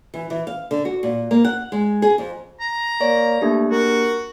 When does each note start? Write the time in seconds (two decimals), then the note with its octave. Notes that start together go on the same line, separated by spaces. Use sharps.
0.14 E3
0.30 E3
0.47 F5
0.71 D3
0.85 F#4
1.03 A#2
1.31 A#3
1.45 F#5
1.72 G#3
2.02 G#4
2.18 F2
2.60 A#5
3.01 A#3 C#5 D5
3.41 A3 A#3 D4 G4
3.71 F#4 A#4